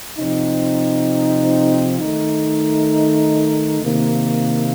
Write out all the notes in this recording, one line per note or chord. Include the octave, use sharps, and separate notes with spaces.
C3 F3 C4 D#4
D#3 A3 D#4
C3 D#3 A#3